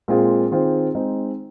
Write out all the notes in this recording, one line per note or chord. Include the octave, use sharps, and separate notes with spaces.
A#2 G#3 C4 F4 G#4
D#3 C4 F4 G#4 C5
G#3 C4 D#4